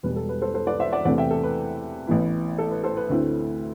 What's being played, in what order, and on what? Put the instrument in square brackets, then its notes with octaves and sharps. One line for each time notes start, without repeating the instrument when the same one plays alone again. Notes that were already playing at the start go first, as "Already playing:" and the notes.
[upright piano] E1 E2 B2 G3 B4
A4
B4
A4 C5
A4 C5
B4 D5
C5 E5
D5 F#5
E2 C3 E3 A3 C4 D5 F#5
E5 G5
A4
B4
A1 A2 E3 B3 E4
A4
B4
A4 C5
B4
D2 D3 A3 C4 E4